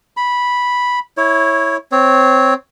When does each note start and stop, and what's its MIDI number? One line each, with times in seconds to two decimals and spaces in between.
0.17 0.99 83
1.17 1.77 64
1.17 1.77 73
1.92 2.54 60
1.92 2.54 73